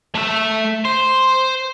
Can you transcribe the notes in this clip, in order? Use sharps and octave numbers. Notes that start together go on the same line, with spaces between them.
A3 E5
C5